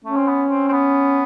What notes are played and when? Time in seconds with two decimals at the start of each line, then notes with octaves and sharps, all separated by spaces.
0.04 A3 C#4
0.17 C4
0.27 B3
0.50 C4
0.68 C4
0.72 B3